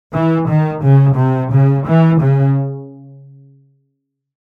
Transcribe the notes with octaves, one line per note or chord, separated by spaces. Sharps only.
E3
D#3
C#3
C3
C#3
E3
C#3